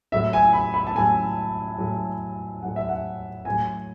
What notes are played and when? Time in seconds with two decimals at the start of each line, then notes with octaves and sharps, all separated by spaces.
0.12 A2 F#3 E5
0.33 G#5
0.53 B5
0.74 B5
0.87 A5
0.95 A2 F#3 G#5
1.78 A2 F#3
2.62 A2 F#3 F#5
2.76 E5
2.89 F#5
3.45 A2 F#3 G#5